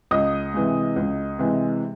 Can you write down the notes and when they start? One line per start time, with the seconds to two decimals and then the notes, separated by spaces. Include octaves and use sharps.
0.11 C#2 D#5 D#6
0.54 C3 E3 G#3
0.96 C#2
1.39 C3 E3 G#3